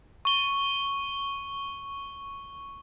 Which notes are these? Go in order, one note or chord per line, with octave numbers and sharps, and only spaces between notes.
C#6 G7